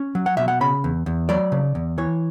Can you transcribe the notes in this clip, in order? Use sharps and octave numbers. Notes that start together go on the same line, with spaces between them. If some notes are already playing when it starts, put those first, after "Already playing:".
Already playing: C#4
F#3
F#5
B2 E5
F#5
C#3 B5
E2
E2
F#3 D5
C#3
E2
E3 C#5